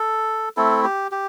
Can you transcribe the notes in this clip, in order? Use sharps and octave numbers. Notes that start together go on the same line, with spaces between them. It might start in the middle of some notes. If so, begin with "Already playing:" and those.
Already playing: A4
A3 C4 E4 A4
G4
G4